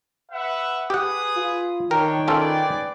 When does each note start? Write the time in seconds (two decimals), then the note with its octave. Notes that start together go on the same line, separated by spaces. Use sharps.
0.31 B4 E5 F#5
0.90 G4 G#4 B4 F#5 D#6
1.37 F4
1.91 D#3 D4 A#4 C#5 G5
2.28 C#4 F4 G#4 A4 B4 D5